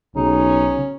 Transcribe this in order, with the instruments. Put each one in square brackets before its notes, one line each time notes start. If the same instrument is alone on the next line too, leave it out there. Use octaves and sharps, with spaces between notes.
[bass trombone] B1 [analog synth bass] C#3 [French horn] C#4 [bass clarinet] D#4